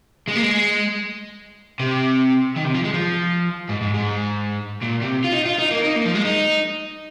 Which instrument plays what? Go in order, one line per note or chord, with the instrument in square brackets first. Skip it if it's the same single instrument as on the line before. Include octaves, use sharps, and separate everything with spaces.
[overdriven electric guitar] G#3
A#3
G#3
C3
D#3
C3
F3
G#3
F3
G#2
G#2
G#2
A#2
C3
F4
D#4
F4
D#4
A#3
D#4
A#3
F3
G#3
D#4